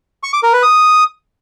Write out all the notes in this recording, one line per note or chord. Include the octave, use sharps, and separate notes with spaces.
C#6
D6
A#4
B4
D#6